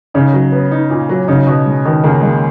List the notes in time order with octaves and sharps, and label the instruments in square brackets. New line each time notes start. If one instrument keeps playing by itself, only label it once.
[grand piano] C#3 [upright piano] D#4
[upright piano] F#3
B3
D#4
A#2
F#3
[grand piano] C#3 [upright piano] D#4
[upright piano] B2
G#3
[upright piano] B2 [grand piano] D#3
[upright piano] C#2 [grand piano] A#3
[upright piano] G#3 [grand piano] A#3